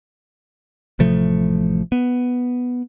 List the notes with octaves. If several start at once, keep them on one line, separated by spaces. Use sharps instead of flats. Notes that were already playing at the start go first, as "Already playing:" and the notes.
A1 C3 F3 A3
B3